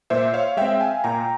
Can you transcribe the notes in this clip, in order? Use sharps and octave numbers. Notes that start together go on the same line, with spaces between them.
A#2 C5 E5
C#5 F5
G#3 C4 E5 G5
F5 G#5
A#2 G5 A#5